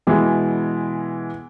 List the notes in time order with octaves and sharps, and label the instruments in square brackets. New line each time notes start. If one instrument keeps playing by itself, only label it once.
[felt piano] B2 E3 G#3